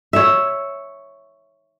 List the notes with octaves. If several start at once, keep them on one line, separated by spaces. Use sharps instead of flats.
C#5 E5